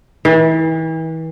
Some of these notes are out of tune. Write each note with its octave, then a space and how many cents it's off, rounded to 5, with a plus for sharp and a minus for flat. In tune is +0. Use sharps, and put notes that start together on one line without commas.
E3 -35